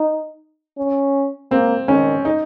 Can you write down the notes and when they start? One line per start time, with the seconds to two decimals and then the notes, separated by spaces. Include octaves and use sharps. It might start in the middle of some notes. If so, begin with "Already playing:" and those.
Already playing: D#4
0.78 C#4
1.51 A#3 C4
1.88 D#3 C#4
2.25 D#4